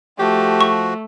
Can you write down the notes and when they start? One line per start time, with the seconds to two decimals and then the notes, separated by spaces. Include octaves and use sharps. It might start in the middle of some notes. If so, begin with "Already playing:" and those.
0.19 F3 A3 F#4 G4
0.61 C#6